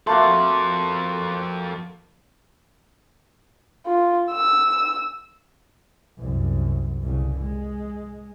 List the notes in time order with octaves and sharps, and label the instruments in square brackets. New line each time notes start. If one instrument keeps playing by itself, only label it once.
[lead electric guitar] F2 A4 [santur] A3 A#3 F#4 [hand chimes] C6
[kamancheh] F4
E6
[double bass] C2 F#2
C2 C#3
G#3